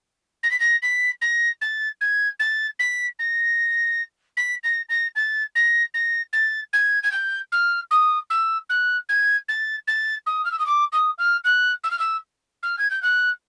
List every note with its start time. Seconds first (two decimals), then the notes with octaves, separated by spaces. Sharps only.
0.43 A#6
0.51 B6
0.60 A#6
0.82 B6
1.21 A#6
1.61 A6
2.01 G#6
2.39 A6
2.79 B6
3.19 A#6
4.37 B6
4.64 A#6
4.89 A#6
5.16 A6
5.55 A#6
5.94 A#6
6.33 A6
6.73 G#6
7.03 G#6
7.12 G6
7.52 F6
7.91 D#6
8.30 E6
8.69 F#6
9.09 G#6
9.48 A6
9.87 A6
10.26 D#6
10.45 F6
10.52 E6
10.59 D#6
10.66 D6
10.92 D#6
11.18 F6
11.44 F#6
11.84 E6
11.91 F6
11.99 E6
12.63 F6
12.78 G#6
12.90 G6
13.02 F#6